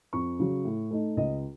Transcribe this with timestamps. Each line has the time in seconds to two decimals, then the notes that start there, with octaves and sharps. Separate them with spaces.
0.13 F2 C#6
0.39 C#3 F#3
0.65 A2
0.91 A3 D#4
1.17 C#2 D#5